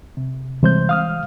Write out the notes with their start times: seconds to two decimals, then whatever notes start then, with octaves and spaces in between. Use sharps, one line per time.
0.17 C3
0.63 C3 E3 G3 G#3 C5 G6
0.89 F5 D#6 F6